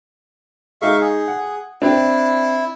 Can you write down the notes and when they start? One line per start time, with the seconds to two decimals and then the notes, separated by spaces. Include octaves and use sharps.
0.82 G#3 D#4 E5 F5 C#6
1.01 G#4
1.28 F#5
1.82 C4 D4 E4